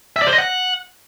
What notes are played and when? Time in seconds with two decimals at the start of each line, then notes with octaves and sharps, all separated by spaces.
0.16 E5
0.22 D5
0.27 C5
0.33 D#5
0.38 F#5